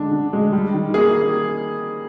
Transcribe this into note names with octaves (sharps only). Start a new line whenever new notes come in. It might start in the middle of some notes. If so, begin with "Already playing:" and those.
Already playing: D3 G#3 D4
D3
G#3
G3
D#3
A#3 G#4